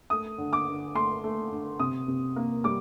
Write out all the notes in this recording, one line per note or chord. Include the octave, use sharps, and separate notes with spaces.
A3 D#6
D3
D6
D3
A3 C6
A3
D3
C3 D#6
C3
A#3
G3 D6